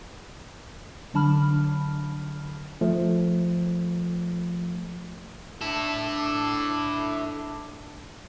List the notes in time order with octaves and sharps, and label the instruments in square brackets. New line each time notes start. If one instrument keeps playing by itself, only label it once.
[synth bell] D3 F#3 D4 A5 B5 F6
[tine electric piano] F3 A3
[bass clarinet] D4 [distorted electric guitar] E4 A4